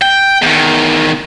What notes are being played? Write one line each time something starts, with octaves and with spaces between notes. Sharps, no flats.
G5
E2 D#3